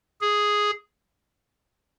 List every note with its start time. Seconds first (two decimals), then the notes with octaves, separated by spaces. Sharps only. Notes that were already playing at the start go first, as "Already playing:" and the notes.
0.21 G#4